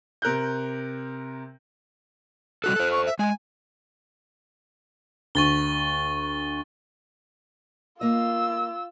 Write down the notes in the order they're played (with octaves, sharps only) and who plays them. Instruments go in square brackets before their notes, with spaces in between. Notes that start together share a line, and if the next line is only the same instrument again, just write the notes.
[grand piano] C3 A#4 F#6 G6
[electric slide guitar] G3 F#4 A4 [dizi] F#6
[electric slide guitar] A4 C5
[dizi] C#6
E5
[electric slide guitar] G#3 [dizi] G#5
[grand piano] D2 [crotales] C#6 A6 G7
[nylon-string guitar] A#3 D#5 [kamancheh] F4 E6